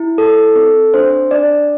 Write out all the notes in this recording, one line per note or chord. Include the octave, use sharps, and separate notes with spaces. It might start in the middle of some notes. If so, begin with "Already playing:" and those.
Already playing: E4
A4
C4 A4
D4 C5
D4 D5